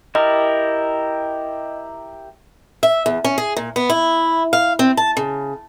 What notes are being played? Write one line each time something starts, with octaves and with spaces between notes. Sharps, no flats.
E4 G4 A#4 D#5
E5
E2
C#4
G#4
A#2
B3
E4
F5
C4
A5
C#3